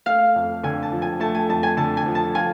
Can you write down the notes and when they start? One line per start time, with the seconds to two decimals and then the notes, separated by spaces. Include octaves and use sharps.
0.06 A3 F5
0.36 F2
0.64 D3 G#5
0.83 A5
0.92 F3
1.02 G#5
1.20 A3 A5
1.35 G#5
1.49 F2 A5
1.63 G#5
1.77 D3 A5
1.97 G#5
2.06 F3
2.15 A5
2.35 F4 G#5